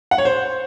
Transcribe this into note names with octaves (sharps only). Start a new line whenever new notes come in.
F#5
C#5
C5